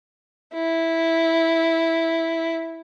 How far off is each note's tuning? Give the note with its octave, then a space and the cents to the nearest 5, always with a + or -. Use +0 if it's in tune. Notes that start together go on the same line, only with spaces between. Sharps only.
E4 -5